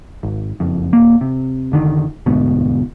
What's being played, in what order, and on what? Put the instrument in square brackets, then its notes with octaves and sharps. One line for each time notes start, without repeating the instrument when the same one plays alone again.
[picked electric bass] G#1
F#1 F2
D#1 A#3
C3
F1 D3 D#3
E1 D2 G#2 B2